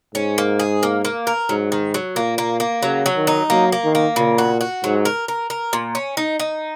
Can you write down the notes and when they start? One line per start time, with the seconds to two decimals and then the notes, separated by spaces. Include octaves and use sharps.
0.15 G#2 C#4
0.38 A#3
0.60 G#4
0.83 A#3
1.05 A#3
1.27 A#4
1.49 G#2 F#3
1.72 D#3
1.94 F#3
2.16 A#2 A#3
2.38 A#3
2.60 A#3
2.83 C#3 F#3
3.06 F#3
3.16 D#3
3.27 D#4
3.50 F#3 A#3
3.72 A#3
3.84 D#3
3.95 A#3
4.16 A#2 C#3
4.38 F#4
4.61 F#4
4.84 G#2 F#3
5.05 A#4
5.28 A#4
5.50 A#4
5.73 A#2
5.95 C#4
6.17 D#4
6.40 D#4